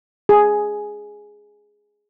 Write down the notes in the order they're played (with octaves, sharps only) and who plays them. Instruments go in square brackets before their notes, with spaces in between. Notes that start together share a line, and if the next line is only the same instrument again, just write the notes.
[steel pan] G#4